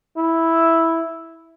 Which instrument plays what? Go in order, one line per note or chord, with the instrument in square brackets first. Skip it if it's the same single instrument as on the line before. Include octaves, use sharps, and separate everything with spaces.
[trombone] E4